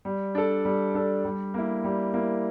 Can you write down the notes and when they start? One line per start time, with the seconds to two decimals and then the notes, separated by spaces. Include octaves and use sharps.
0.05 G3
0.35 D4 A4
0.65 G3
0.94 D4 A4
1.25 G3
1.54 A#3 E4
1.84 G3
2.14 A#3 E4